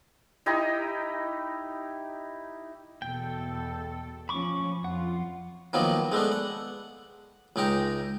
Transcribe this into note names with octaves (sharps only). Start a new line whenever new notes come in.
D#4 E4 G4 D#5
E2 B2 A4 G5
F3 C#4 B5 C#6 D6
F2 F4 F#5
D#3 F3 F#3 A#3 B3
G#3 A3 B3 D4
F#5
C#2 G#3 D#4 G5 A#5